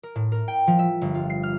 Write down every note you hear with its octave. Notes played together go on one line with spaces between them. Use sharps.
A#4
A2
A#4
G5
F3
E5
G1
F4
C7
F6